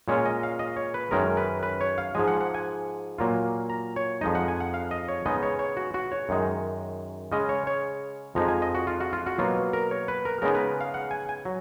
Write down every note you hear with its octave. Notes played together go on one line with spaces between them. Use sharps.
A#2 G#3 C#4 F4 C#5
D#5
F5
D#5
C#5
B4
F#2 D#3 G#3 C#4 A#4
B4
B4
C#5
F5
G#2 F3 G#3 G#5
F#5
F#5
G#5
A#2 F#3 A#3 F4
A#5
C#5
F2 F3 G#3 D#4 D#5
F#5
G#5
F#5
F5
D#5
C#5
C#3 G#3 B3 D#4 D#5
C#5
C#5
F#4
F#4
C#5
F#2 D#3 G#3 D#4
C#3 G#3 C#4 D#5
C#5
C#5
F2 F3 G#3 D#4 A#5
G#5
D#5
F#4
F4
F#4
F4
F#4
B2 F#3 A#3 F4
A#4
C#5
B4
A#4
C#3 G#3 B3 D#4 A#4
B4
F5
F#5
G#5
G#5
F#3